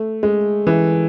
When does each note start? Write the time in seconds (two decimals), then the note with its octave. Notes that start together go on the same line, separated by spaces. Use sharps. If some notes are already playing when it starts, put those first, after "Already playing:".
Already playing: A3
0.23 G#3
0.67 E3